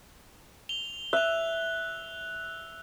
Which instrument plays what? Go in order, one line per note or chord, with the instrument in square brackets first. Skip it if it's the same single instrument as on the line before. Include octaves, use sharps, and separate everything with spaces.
[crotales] F7 G7
[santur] E5 [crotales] F#6 F7